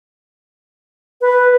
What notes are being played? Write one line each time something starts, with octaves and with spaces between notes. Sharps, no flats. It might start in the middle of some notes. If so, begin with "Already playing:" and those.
B4